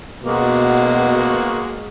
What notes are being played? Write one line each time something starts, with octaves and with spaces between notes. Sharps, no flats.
B2 G#3 A#3 F#4